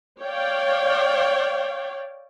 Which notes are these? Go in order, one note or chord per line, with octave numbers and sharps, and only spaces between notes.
C#5 D5 F5 G5